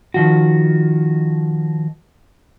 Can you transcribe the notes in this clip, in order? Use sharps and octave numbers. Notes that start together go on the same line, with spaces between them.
D#3 F3 F#4